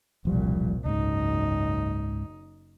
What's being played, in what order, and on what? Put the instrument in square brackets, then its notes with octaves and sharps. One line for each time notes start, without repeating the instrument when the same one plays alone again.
[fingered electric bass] E1 F3 G3 [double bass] C2 A#2
[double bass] F#1 D#4 [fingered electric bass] C#2 G#2